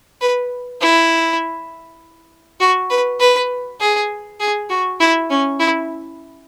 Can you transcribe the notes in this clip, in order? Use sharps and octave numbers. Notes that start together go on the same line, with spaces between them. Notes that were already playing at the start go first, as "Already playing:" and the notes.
B4
E4
F#4
B4
B4
G#4
G#4
F#4
E4
C#4
E4